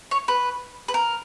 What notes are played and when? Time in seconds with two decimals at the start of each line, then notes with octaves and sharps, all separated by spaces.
0.11 C#5
0.28 B4
0.88 B4
0.94 A#4